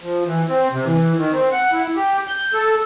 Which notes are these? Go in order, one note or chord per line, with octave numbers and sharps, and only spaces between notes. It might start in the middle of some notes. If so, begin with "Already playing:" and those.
F3
E3
C4
C3
E3
D#3
C4
F#5
E4
G4
G6
A4